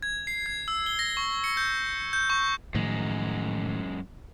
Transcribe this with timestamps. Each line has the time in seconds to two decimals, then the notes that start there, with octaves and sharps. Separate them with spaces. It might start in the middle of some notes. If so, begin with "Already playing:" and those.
0.03 G#6
0.27 C7
0.46 G#6
0.68 E6
0.86 G7
0.99 A#6
1.17 C#6
1.44 C#7
1.57 G6
2.13 G6
2.30 C#6
2.75 F#2 A2 D#3 F3 G#3